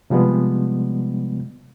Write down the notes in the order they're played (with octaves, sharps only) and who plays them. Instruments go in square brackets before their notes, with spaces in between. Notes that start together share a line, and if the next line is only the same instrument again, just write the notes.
[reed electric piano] C3 F3 G3 G#3 B3